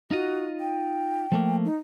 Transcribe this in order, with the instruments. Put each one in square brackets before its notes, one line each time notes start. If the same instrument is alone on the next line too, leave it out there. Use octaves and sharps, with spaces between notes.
[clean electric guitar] D#4 F4 D#5 [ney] F#4
[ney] G5
[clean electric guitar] F3 A3 A#3
[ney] D#4